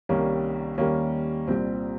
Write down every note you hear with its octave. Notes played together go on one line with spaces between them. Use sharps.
C2 C3 D#3 G3 A#3 C#4
D#2 D#3 G3 A#3 C#4
C2 A#2 G3 C4